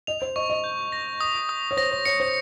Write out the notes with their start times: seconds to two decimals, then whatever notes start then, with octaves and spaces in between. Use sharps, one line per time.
0.07 D#5 F7
0.22 C5
0.36 D#5 C#6
0.50 D#5
0.64 G6
0.92 A#6
1.21 D#6
1.49 D#6
1.71 C#5
1.77 C5 A#6
1.92 C5
2.05 C#5 C#7
2.20 C5